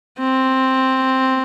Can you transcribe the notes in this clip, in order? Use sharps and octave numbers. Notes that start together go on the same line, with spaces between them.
C4